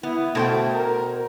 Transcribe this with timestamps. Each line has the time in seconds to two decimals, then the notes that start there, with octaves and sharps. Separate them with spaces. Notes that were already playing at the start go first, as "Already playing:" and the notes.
0.03 B3 E4
0.35 B2 A3 C5 G5
0.73 A#4